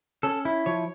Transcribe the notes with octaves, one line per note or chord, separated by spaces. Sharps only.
C#4 A4
E4
F3 C#5